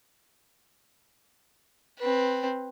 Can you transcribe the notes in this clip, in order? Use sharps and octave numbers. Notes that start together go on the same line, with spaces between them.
C4 B4